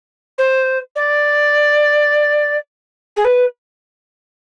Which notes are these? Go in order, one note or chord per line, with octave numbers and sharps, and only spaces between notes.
C5
D5
G#4
B4